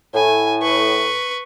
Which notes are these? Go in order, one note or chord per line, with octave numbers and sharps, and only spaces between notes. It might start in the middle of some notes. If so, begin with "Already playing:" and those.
A2 G#5
B4 C#6